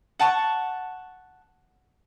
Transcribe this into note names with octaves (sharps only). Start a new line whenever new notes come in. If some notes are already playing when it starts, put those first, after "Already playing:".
F#5 A5 C#6